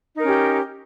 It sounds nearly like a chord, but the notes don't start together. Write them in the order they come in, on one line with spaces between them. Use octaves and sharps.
D#4 A#4 C#4 G4